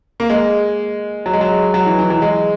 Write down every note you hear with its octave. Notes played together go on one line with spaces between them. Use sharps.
A#3
G#3
F#3
G#3
F#3
F#3
E3
E3
F#3
G#3